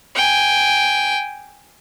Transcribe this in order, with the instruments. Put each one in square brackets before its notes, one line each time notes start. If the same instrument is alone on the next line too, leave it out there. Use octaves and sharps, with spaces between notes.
[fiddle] G5 G#5